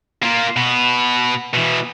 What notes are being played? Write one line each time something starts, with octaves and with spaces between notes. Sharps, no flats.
A#3 F4
B2 B3
B2 E3